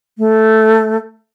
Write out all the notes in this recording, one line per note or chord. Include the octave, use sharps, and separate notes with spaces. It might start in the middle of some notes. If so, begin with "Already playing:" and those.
A3